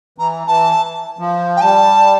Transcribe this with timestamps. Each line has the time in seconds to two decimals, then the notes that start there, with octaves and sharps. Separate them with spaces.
0.18 E3 A#5
0.47 E3 A5
1.19 F3
1.56 G5
1.61 G3 A5